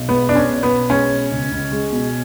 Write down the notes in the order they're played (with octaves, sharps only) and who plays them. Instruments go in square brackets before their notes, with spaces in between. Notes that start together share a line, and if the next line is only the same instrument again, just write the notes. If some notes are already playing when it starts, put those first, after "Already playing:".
Already playing: [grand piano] B1
[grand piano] G#3 [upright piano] B3
[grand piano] B2 [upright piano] D4
[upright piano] C#4
[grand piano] B1
[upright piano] B3
[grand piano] B1
[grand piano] G#3 [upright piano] C#4
[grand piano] B2
C#2
C#2
G#3
B2